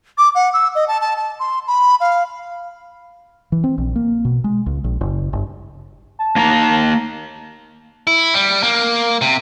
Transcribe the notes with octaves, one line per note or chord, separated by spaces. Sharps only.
D6
F#5
E6
D#5
A5
A5
A5
C6
B5
F5
E3
C4
A#1
A#3
B2
G#3
C#2
A#1
F#1
G1
A5
A#3 D#4 A#5
E4
G3
A#3
C3